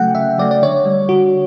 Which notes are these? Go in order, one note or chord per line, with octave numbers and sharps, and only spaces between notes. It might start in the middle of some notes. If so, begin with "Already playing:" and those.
Already playing: C#3 F#3 A3 F#5 G5
C#3 E5
F#3 A3 D5
D5
D3 C#5
G3
D3 F#4